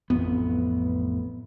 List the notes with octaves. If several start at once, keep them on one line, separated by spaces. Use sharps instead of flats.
A1 F2 B3